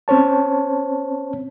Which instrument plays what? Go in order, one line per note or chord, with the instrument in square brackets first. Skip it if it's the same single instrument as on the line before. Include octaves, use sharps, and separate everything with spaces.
[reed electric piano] C4 C#4 C5 C#5 A5